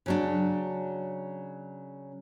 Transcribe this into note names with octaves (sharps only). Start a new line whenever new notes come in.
C#3 F#3 D4